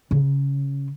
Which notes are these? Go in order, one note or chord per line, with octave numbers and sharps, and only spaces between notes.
C#3